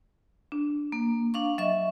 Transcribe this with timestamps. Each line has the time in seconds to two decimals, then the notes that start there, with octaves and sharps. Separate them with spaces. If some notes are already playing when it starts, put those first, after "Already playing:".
0.52 D4
0.92 A#3
1.34 D4 F5 C#6
1.58 F#3 D#5 E5 C#6